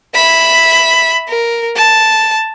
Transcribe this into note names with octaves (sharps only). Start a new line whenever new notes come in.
E5 B5
A#4
A5